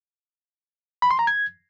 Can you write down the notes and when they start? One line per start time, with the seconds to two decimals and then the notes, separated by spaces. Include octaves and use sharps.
1.02 B5
1.11 C6
1.19 A#5
1.27 G#6